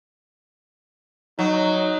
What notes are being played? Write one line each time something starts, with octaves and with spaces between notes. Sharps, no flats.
F#3 D#4